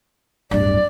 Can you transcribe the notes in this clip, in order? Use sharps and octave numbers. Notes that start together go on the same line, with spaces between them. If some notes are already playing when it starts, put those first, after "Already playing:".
D1 G2 D5